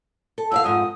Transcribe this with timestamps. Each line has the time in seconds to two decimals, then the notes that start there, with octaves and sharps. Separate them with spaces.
0.38 A4
0.52 E2 D5 F5 E6
0.64 F2 G#2 D#6